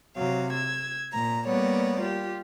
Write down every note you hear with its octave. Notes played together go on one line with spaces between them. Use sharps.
C3 F#3 F5
E6 G#6
A#2 A#5
G3 A#3 B3 C#5 D5
F4 G4